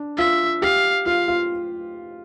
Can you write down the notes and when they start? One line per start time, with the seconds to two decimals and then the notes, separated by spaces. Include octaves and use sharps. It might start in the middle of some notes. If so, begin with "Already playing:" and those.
Already playing: D4
0.17 F4 E5
0.62 G4 F5
1.06 F4 F5
1.28 F4